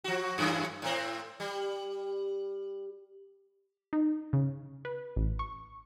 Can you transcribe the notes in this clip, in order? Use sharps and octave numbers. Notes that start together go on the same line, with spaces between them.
F3 F#4
F#2 A2 E3
A2 C4
G3
D#4
C#3
B4
A1
C#6